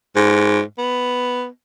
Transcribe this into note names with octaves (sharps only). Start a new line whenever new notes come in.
G#2
B3